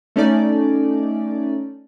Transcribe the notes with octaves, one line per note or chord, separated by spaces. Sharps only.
A3 C#4 D#4 D5